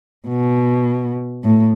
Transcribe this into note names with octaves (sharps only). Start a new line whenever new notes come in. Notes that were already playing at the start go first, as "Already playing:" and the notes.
B2
A2